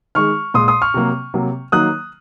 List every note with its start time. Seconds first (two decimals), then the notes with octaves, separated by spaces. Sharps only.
0.15 D#3 G#3 C#6 F6
0.54 A#2 G#3 C6 D#6
0.68 C6 D#6
0.82 C#6 F6
0.94 C3 F#3 A#3
1.34 C3 F#3 A#3
1.72 D#3 F#3 A#3 D#6 F#6